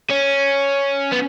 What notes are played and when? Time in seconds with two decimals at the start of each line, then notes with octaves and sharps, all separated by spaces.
0.10 C#4
1.12 B3